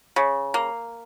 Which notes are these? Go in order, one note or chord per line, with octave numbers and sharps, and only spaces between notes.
C#3
A#3